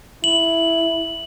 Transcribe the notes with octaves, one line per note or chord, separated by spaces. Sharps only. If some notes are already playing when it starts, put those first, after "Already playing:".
E4 F#7